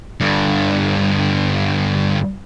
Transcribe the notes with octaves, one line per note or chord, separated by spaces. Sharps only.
G2 D3